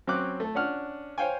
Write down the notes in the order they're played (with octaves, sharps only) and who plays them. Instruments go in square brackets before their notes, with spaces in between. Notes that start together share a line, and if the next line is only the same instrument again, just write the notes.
[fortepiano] F#3 C4 C#4 D6 F#6
A3 A4
C#4 D4 F#5 F6
C5 C#5 F5 G5 G#5